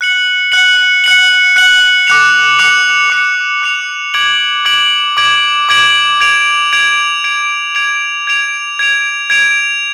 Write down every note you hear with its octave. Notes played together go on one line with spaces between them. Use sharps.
F#6 C#7 F#7
F#6 C#7 F#7
F#6 C#7 F#7
F#6 C#7 F#7
D6 F#6 C#7 F7
D6 F#6 C#7 F7
D6 F#6 C#7 F7
D6 F#6 C#7 F7
D6 G#6 D7 F#7
D6 G#6 D7 F#7
D6 G#6 D7 F#7
D6 G#6 D7 F#7
G#6 D7 F7
G#6 D7 F7
G#6 D7 F7
G#6 D7 F7
G#6 D7 F7
G#6 D7 F7
G#6 D7 F7